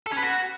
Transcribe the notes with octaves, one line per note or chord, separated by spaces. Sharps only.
A4
C#4
B4
F#4